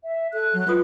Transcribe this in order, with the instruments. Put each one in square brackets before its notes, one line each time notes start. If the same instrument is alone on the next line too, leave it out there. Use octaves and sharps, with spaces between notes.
[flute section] E5
[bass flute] A4 [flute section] F#6
[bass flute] F#3
[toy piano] F4 D#6 [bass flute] B4